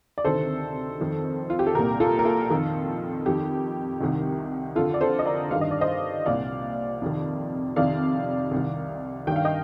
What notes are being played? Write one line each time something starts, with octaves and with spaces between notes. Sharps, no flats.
D5
D2 C3 D#3 A4 C5
F2 D#3
F4
G4
A4
C2 A#2 G4 A#4
F4 A4
A#4
F4 A4
F2 D#3
F2 D#3 G4
C2 C3 D#3
F2 D3 F4 A4
D5
A4 C5
D#5
A#4 D5
G2 D#3 F5
D#5
D5
C5 D#5
C2 A#2 D5 F5
F2 C3 D#3
F2 C3 D#3 D5 F5
C2 C3 D#3
G2 D#3 G5
F5
D#5 G5